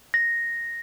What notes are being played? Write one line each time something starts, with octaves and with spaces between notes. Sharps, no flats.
A#6